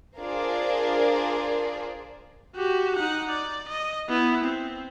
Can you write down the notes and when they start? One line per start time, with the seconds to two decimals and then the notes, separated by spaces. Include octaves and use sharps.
0.19 D4 F4 G#4 A#4 C5 D5
2.55 F#4 G4
2.96 D#4 F#5
3.30 D5
3.68 D#5
4.09 B3 E4
4.44 C4